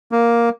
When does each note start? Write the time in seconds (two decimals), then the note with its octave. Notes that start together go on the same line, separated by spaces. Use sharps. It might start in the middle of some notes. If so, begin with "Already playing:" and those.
0.12 A#3